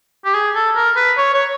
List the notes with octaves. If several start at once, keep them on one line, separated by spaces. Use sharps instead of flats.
G4
G#4
A4
A#4
B4
C#5
C#5